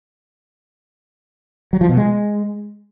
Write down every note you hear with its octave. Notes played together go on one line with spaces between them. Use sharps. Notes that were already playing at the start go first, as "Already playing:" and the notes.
F#3
F3
B2
G#3